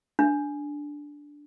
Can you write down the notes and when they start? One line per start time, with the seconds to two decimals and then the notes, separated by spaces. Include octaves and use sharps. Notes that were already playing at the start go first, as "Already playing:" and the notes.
0.19 D4